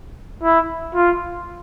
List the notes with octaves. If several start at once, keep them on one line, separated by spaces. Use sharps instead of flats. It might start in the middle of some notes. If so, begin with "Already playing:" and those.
E4
F4